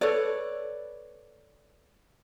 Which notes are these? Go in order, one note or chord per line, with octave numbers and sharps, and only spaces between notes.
A4 B4 C#5 D5